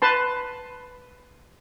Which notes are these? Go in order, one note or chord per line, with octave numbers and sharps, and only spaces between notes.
B4 A5 C6